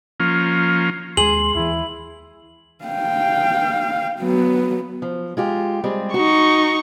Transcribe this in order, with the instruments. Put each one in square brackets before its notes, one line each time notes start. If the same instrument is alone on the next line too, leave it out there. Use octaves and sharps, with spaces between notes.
[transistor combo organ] F3 A#3 C#4 F4
[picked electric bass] D#2 G#3 [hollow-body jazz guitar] G#4 [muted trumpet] C6 [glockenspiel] F#7
[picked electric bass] D#2 E3 [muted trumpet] E4
[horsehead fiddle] F5 G5
F#3 B3
[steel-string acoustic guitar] F3
G#3 F4 G4
G3 G#3 C4
[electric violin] D#4 C#6 [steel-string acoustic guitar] F#4